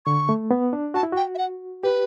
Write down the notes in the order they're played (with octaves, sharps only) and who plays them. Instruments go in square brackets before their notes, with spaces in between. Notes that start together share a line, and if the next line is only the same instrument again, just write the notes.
[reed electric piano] D3 [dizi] C#6
[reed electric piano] A3
B3
D4
[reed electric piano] F#4 [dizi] A5
[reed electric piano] E4
[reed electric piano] F#4 [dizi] G5
[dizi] E5
F#5
[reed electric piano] G4 [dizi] B4